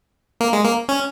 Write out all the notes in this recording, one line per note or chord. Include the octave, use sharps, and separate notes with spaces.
A#3
G#3
A#3
C#4